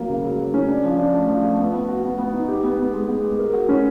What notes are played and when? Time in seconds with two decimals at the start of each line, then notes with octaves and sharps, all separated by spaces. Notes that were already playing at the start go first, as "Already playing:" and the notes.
Already playing: F#3 A#3
0.09 C#3
0.23 F#3
0.38 F#3
0.54 C#4
0.68 D4
0.84 F3
0.98 D4
1.13 A3
1.28 F3
1.44 A3
1.58 B3
1.73 B3
1.88 F#4
2.03 B3
2.18 B3
2.33 D#4
2.48 G4
2.64 B3
2.78 B3
2.93 G#3
3.09 B3
3.23 G#3
3.39 A#4
3.53 F#4
3.69 C#4